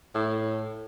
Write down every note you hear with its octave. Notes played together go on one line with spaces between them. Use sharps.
A2